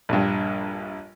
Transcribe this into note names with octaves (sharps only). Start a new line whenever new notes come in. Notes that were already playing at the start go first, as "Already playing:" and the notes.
A#1 G2